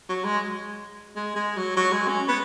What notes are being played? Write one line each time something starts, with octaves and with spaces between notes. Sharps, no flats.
F#3
G#3
G#3
G#3
F#3
F#3
G#3
C#4
B3